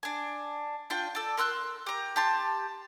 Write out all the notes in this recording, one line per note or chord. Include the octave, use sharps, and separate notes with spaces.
D4 G#5
D4 F4 G5
A4 D5
A#4 C6 E6 F#6
G4 A#5
G4 A5 C6